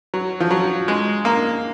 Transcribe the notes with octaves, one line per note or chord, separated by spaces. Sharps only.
F#3
F3
F#3
G#3
A#3